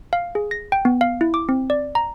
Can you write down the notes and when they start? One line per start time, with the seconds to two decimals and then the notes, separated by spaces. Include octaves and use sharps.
0.13 F5
0.35 G#4
0.51 A#6
0.72 G5
0.85 B3
1.01 F5
1.21 E4
1.34 D6
1.49 C4
1.70 D5
1.95 A#5